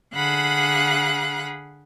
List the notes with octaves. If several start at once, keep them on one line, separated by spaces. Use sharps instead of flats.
D3 G#4 F5 F#5 B5 F#6